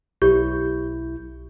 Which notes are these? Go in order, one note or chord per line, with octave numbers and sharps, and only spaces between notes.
B1 E4 G4 G6